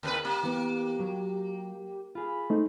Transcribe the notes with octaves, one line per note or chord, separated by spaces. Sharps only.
D#2 C4 A#4 B4
A#3 G4
E3 B3
F#3
F4 G#4 B5
A3 D#4 C5